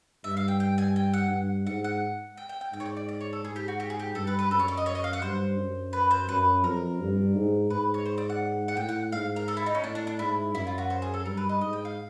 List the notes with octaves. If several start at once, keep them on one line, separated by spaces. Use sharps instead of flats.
G2 E5
F5
G5
G5
G#5
G5
F#5
G2
G#2 F#5
F#5
G5
G5
G5
G#2 G5
C#5
D5
D5
D5
C#5
A4
G#2 G#4
G4
F#4
G4
G#4
G4
G2 A4
B4
B4
F#2 A4
C#5
D5
D#5
C#5
D#5
F5
F#5
G2 C5
F#2
B4
C5
F#2 B4
F2 A#4
G2
G#2
G#2 B4
C#5
C5
D5
F#5
F#5
A2 G5
F#5
G#2 F5
A#4
A4
E4
D#4
C#4
A2 D4
D4
D4
G#2 E4
F#2 E4
F4
F#4
C5
G#4
A4
G2 A#4
B4
D#5
G#2 D#5
G5
F5